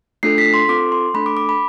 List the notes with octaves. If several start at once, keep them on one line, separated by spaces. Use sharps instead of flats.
A3 D4 F4 A4 C7
B6
C6
C4 F4 A4 D6
C6
A3 D4 A4 B5
D6
D6
B5